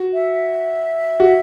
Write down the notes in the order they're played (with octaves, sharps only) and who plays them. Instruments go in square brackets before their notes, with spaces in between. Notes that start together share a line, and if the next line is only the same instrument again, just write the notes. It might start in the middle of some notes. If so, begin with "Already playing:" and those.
Already playing: [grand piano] F#4
[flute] E5
[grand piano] F#4